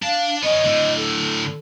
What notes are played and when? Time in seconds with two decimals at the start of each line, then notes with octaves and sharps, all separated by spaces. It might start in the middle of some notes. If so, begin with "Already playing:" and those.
0.03 D4 F5 A5
0.43 B3 C#4 D#5
0.64 A2 D3
0.96 A4